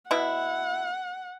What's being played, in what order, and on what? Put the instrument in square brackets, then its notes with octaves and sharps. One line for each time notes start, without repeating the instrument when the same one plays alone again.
[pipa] B2 E4 [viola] F#5